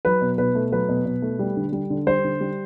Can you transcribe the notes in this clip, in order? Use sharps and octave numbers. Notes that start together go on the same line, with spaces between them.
F#3 B4
B2
B2 B4
A3
F#3 B4
B2
B2
A3
G3
D3
G3
D3
G3 C5
D3
G3